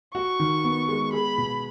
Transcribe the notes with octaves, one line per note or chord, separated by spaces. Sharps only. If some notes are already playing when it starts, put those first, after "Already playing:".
F#4 C#6
D#3
B3
G#3
G#4 B5
B2